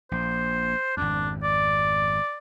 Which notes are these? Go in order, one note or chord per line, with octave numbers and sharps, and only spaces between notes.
A#1 C5
G#1 F2 D4
D5